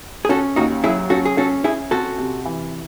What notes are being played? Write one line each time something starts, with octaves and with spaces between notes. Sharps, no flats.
G#4
C#4 F#4 A4
D#2 D#4 F#4
F#3 E4 G#4
C#4 F#4 A4
G#4
C#4 F#4 A4
C#4 E4 G#4
C4 F#4 A4
C3
E3